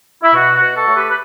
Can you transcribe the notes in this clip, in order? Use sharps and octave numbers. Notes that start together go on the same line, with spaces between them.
E4
B2 F#4
F#4
B2
F#4 A4
A3 C#5
G4 B4
B4